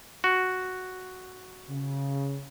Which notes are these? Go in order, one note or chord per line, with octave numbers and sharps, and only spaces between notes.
F#4
C#3